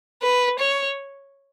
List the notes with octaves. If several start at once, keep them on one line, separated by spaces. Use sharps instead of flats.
B4
C#5